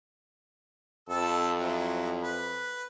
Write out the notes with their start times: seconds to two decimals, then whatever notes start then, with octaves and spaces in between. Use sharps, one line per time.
1.09 F2 A4 A5 E6
1.56 F#3 E4
2.22 B4